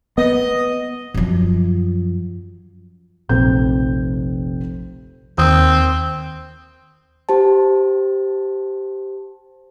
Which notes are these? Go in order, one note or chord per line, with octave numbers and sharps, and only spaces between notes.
B3 D#5
F#2 F3
F1 A#1 C4 G6
D#2 C4 D#6
G4 C5 A5